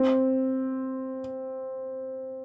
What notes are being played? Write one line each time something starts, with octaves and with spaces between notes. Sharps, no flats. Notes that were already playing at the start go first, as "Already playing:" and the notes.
Already playing: C4